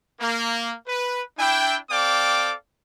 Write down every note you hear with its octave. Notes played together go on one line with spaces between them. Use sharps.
A#3
B4
D4 E4 G5
C4 A4 D5 F5 G5 D6